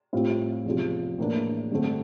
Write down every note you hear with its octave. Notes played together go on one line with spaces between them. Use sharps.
A2 G3 C4 F4
E2 C3 F3
A2 E3 A#3 D4
G2 D3 A3 C4